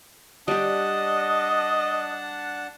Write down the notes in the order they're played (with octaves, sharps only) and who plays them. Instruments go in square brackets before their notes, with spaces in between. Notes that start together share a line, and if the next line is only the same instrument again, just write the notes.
[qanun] G3 G4 [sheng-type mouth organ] D4 F#5 A5 [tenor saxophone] D#5